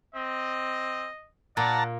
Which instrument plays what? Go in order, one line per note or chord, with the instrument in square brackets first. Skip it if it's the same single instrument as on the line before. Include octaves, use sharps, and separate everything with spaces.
[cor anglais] C4 [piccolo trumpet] D#5
[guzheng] A#2 [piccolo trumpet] D5 [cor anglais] F#5 [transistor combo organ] A5 A#5